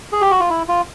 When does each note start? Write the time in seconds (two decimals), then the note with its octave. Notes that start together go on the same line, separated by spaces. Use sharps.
0.13 G#4
0.21 G4
0.31 F#4
0.40 F4
0.50 E4
0.69 F4